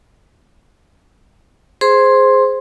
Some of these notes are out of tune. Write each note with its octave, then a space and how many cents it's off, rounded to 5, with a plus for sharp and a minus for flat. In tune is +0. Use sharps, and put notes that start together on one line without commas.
G#4 +0 C5 +0 C6 +10